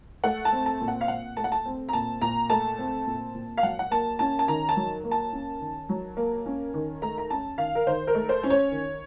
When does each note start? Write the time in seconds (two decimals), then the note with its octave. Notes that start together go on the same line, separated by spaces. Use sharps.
0.24 A3 F#5
0.45 A5
0.52 C4
0.66 A5
0.81 A#2
0.88 F#5
1.01 F5
1.08 A#2 F#5
1.37 A3 A5
1.44 F#5
1.52 A5
1.65 C4
1.89 A#5
1.93 A#2 A5
2.22 A#2 A#5
2.50 A3 A5
2.78 C4
3.06 A#2
3.34 A#2
3.58 F5
3.63 F#3 F#5
3.79 F#5
3.91 A#3 A5
4.19 C#4 A5
4.39 A5
4.48 D#3 A#5
4.69 A5
4.77 F#3
5.04 A#3
5.11 A5
5.32 C#4
5.60 D#3
5.89 F#3
6.17 A#3
6.46 C#4
6.74 D#3
7.02 A3 A#5
7.18 A#5
7.30 C#4 A5
7.58 D#3 F5
7.75 A#4
7.87 D#3 C5
8.07 A#4
8.15 A3
8.29 C5
8.43 C#4
8.50 C#5
8.71 D#3